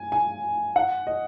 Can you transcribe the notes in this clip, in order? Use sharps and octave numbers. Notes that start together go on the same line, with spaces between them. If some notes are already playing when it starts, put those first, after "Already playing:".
Already playing: G#5
G#5
F#5
D#5